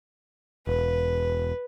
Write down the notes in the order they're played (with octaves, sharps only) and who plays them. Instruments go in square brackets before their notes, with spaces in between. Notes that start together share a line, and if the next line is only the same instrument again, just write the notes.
[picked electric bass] E1 [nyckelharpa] B4